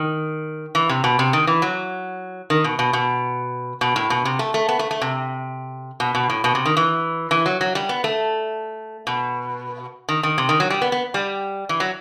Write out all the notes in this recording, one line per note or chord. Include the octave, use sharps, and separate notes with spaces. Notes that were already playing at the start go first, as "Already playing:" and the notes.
Already playing: D#3
E3
C3
B2
C3
D#3
E3
F#3
D#3
B2
B2
B2
B2
A2
B2
C3
A3
A3
B3
A3
A3
C3
B2
B2
A2
B2
C3
D#3
E3
E3
F#3
F#3
G3
B3
A3
B2
D#3
D#3
C3
D#3
F#3
G3
B3
B3
G3
E3
F#3